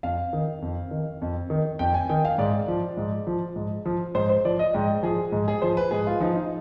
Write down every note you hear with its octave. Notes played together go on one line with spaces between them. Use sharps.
F2 F5
D#3
F2
D#3
F2
D#3
F2 G5
G#5
D#3 G5
F5
G#2 D5
F3
G#2
F3
G#2
F3
G#2 C5
C5
F3 D5
D#5
G#2 G5
F3 G#4
G#2
G#4
F3 C5
B4
G#2 G#4
F4
F3 D#4
D#4